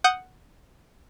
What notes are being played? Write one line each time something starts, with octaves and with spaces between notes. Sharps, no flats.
F#5 D#6 G6